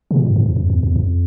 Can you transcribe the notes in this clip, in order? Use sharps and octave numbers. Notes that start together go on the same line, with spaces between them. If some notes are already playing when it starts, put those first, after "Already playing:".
C3
A#2
G2
A2
F2
F2
E2
E2
F2